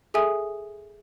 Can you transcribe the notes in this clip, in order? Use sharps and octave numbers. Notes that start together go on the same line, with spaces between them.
G#4 A4 E5 G#5 D#6